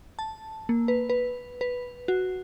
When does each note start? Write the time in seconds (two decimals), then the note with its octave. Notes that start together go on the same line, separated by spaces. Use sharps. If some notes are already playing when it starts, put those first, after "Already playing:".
0.19 A5
0.69 A#3
0.88 B4
1.10 B4
1.61 B4
2.08 F#4